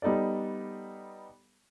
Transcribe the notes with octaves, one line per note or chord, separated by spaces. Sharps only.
G3 B3 D#4 A4 D5